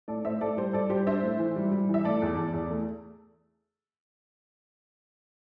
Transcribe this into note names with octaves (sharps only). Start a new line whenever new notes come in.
A2 A4 D5
A2 C5 E5
A2 A4 D5
G3 G4 C5
G3 A4 D5
G3 G4 C5
D4 C5 E5
A2
E3
G3
G3
E3 E5
A3 A4 D5
E2
E2
E2
A3